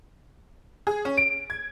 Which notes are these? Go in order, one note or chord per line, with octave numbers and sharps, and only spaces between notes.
G#4
C#4
D7
G#6